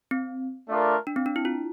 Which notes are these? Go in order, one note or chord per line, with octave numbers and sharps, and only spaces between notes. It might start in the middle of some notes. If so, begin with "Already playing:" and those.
C4
A3 D4 F4 A#4 D5
D4
C4
D4
E4
F4